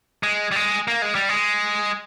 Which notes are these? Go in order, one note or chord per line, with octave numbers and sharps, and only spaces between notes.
G#3
G3
G#3
A#3
G#3
G3
G#3